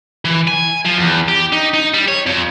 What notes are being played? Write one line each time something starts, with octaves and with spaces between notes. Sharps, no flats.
E3
G#5
F3
E2
G4
D#4
D#4
G3
C#5
F2